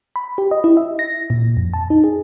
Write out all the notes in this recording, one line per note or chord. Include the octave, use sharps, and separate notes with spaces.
B5
G4
D#5
E4
E5
A#6
A#2
F2
A5
D#4
G#4